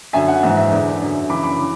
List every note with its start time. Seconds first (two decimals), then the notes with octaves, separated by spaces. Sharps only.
0.13 F#2 D3 E5 G#5
0.28 F#5
0.43 G#2 E3 E5
0.57 E5
0.71 E2 D3
1.01 F#2 D3
1.30 F#2 C#3 E3 B5 D6
1.43 B5 D6
1.59 E3